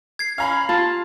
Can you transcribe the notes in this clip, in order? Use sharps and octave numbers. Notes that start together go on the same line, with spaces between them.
G#6 C7
C#4 F5 A#5 B5
F4 A5